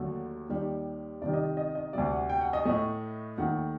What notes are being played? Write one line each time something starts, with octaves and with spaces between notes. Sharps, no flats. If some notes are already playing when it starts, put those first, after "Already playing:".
Already playing: D#2 D3 F#3 A3
D#2 D#3 G3
C2 C3 D#3 D5
D#5
D#5
D#5
D2 C3 G3 D5
F#5
G5
F#5
D#5
A2 A3 D#5
D#2 D#3 A3 F#5